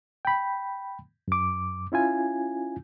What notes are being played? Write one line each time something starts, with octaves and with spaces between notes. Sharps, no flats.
G5 B5
F#2 D6
C#4 E4 F4 G#5